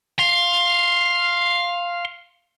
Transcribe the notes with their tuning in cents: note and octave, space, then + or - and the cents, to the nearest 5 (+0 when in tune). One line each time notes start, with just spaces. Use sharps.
F5 +0 C6 +20